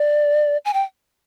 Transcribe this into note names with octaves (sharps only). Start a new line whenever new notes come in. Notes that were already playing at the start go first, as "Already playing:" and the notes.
Already playing: D5
G#5
G5